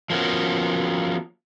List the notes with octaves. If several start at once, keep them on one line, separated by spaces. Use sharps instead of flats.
F3 A#3 B3 C#4 F#4